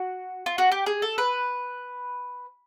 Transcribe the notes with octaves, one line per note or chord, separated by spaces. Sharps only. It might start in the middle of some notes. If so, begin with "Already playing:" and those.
Already playing: F#4
F4
F#4
G4
G#4
A4
B4